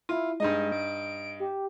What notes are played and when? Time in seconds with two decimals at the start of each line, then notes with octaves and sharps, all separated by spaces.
0.09 E4 F4
0.40 G2 G#3 D#4 D#5
0.72 D7
1.40 G4